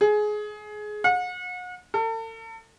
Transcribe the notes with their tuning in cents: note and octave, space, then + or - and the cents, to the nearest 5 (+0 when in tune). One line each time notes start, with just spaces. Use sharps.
G#4 +20
F#5 -40
A4 +40